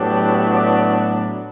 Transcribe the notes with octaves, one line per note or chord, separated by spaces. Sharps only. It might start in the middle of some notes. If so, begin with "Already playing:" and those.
Already playing: A2 F#3 B3 D4 G4
D5